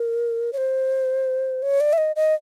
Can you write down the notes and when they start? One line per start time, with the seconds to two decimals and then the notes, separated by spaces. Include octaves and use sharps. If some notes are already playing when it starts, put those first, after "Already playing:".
Already playing: A#4
0.53 C#5
0.57 C5
1.62 C#5
1.80 D5
1.93 E5
1.98 D#5
2.16 D#5